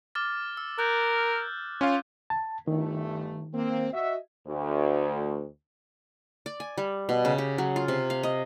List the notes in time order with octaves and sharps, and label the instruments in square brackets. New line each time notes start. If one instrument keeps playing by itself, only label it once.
[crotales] D6 F6 A6
E6
[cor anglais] A#4 [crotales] F#6 G6
[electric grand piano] C#4 F5 [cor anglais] F4
[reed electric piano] A5
[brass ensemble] G1 A3 [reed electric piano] D#3
[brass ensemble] A#3 C4
F#4 D#5 E5
[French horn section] D2
[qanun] D5
G#5
G3
B2
C#3
G4
F#3
F4
C3
F5
D#5